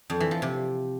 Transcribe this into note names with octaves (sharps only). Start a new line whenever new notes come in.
F2
E3
F3
C3